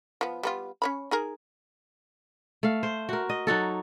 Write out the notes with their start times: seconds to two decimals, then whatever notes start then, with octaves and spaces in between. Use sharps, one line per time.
0.21 F3 B3
0.43 G3 B3 F4
0.82 C#4 C#5 B5
1.11 D#4 G#4 A#4
2.63 A3 F5
2.83 C5
3.09 F#4 A#4
3.29 D#5
3.47 F#3 D#4 F#4 A4